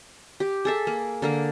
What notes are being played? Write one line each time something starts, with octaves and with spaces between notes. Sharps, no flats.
G4
G#4 A4 E5
A#3
D3 A#3 A#4